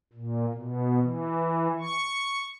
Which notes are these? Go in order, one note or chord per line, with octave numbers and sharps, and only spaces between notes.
A#2
B2
E3
C#6